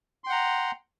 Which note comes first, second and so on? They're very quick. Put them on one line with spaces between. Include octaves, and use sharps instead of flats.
C6 G5 F#5 A#5